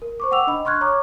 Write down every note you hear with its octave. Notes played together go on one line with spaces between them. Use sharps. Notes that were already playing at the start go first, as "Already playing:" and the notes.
A#4
C5 C#6 D6
F#5 G5 D6 E6 F7
D4 D#5 B5
C6 C#6 F6 F#6 G#6
C#5 A#5 C#6 D6